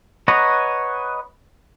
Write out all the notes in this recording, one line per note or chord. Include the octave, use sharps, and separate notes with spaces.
B4 C#5 D#5 F#5 A#5